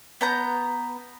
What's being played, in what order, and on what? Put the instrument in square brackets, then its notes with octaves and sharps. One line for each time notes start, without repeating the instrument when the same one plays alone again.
[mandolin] B3 A#5 G6